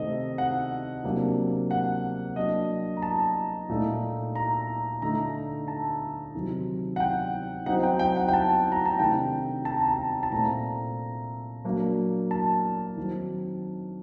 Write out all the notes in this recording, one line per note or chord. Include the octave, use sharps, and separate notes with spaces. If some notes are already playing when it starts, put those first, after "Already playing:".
Already playing: C3 D#3 A3 C4 D#5
F#5
C3 F#3 A#3 D4
F#5
F#3 A#3 D4 D#5
A#5
A5
A#2 A3 D#4
A#5
D3 A3 D#4 A#5
A5
C3 D#3 F#3
F#5
G5
F#3 C4 D#4 F#5
G5
G5
F#5
G5
A5
A#5
A5
C3 D#3 A3 D4 G5
A5
A#5
A5
A5
A#2 A3 C4 A#5
F#3 A#3 D4
A5
D#3 F#3 C4